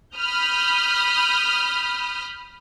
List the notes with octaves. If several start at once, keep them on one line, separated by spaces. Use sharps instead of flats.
B5 D#6 F6 G6